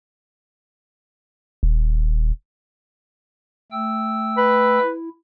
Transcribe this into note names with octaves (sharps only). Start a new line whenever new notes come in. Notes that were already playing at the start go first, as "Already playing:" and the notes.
D#1
A3 G5 E6
B4
E4